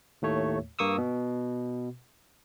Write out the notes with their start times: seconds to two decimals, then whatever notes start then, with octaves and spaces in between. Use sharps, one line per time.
0.22 D#2 A2 A3 C#5
0.79 G2 A#3 C#6 D#6 E6
0.98 B2